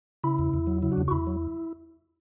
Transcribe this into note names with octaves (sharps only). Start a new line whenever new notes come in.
C#3 E4
E2
E2
F#3
C#3 E4
D4 F#4
E2
F#4
E2 E4
F#3